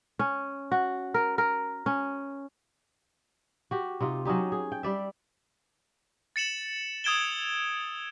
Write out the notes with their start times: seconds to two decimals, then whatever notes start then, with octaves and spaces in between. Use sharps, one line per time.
0.19 C#4
0.72 F#4
1.14 A#4
1.38 A#4
1.86 C#4
3.71 F#4 G4
4.00 C3 D#4 F4
4.25 F#3 C#4 D#4 G4
4.52 G#4
4.72 G5
4.83 G3 D5 E5
6.36 A6 C#7 E7 F#7
7.04 D#6 E6 G#6 D7 E7 G7